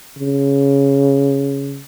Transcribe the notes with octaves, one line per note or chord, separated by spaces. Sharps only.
C#3